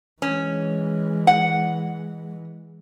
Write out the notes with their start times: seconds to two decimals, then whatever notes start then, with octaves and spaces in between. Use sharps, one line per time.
0.22 E3 G#3 C#4
1.27 F#5